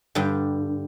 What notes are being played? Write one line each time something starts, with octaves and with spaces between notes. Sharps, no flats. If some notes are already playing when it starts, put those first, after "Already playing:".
G2 D3 G3